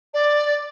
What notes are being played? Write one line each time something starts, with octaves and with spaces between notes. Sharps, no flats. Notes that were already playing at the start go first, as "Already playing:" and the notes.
D5